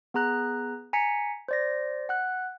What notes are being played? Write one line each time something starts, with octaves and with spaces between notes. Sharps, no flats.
B3 G#4 A#5 F#6
G#5 A#5 B6 C#7
C5 D5 A#6
F#5 F#6